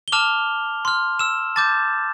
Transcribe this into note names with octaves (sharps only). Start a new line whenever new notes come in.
G7
A5 D6 F6 F7
C6 F6
E6 E7
A5 D6 G6 A6